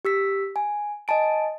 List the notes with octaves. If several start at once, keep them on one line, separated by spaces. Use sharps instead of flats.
G4 E6 B6
G#5
D#5 G#5 A5 D7